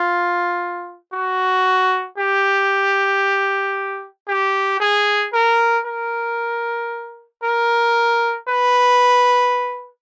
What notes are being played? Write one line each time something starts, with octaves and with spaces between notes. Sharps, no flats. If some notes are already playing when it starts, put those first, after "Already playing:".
Already playing: F4
F#4
G4
G4
G#4
A#4
A#4
A#4
B4